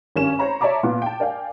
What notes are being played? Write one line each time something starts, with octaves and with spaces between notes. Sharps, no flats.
G#1 G2 C#4 A#4 G#5 E7
C5 C#5 A#5 B5
C#5 D5 E5 A5 A#5 D6
A#2 B3 F4
G5 A5
A#4 D5 F5 G5 G#5